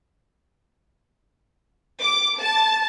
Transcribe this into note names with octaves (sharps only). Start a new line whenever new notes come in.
D6
A5